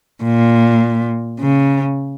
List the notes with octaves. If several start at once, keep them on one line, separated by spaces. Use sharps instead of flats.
A#2
C#3